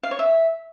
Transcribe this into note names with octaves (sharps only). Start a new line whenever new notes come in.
F5
C#5
E5